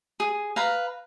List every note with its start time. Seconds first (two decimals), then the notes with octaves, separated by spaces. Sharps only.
0.20 G#4
0.56 B4 F5 A#5